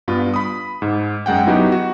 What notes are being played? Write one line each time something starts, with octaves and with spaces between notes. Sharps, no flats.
G2 B3 F4
B5 D#6
G#2
F#2 G#3 F#5 G5
F#3 B3 D#4 E4 F#4 G4
F#4